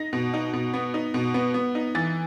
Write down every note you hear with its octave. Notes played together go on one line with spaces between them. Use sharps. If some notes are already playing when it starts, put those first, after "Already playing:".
Already playing: D#4 A#6
B2
D#4
B2
B3
D#4
B2
B3
B3
D#4
E3 A6